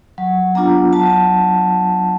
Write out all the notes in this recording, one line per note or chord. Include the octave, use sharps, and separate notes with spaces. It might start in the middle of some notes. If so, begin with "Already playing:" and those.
F#3
B3 D4 F4 A#5
F#3 A5